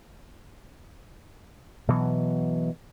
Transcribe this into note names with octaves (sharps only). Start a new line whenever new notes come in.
B2 E3 F#3